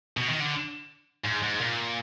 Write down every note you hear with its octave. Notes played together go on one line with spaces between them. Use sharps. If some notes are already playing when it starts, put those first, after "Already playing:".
B2
D#3
D3
G#2
G#2
A#2